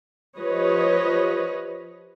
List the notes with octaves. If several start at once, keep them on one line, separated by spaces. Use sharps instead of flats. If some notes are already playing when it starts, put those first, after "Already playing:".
F3 G4 B4 C#5 D#5